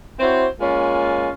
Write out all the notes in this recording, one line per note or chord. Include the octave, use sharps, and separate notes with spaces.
C4 E4 F#4 C5 C#5
G#3 A#3 C#4 F4